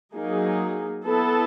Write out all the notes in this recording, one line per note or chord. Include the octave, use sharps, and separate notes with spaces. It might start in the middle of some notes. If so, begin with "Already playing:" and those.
F#3 A#3 D#4 G#4
B3 E4 A4